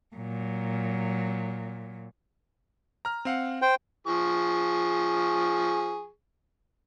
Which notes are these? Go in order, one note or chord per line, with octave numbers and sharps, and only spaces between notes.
A#2 F#3
A#5 F6
C4 F5 F#5
C5 G5
F3 G#4 C#6